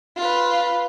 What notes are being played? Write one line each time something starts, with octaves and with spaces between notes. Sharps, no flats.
F4 B4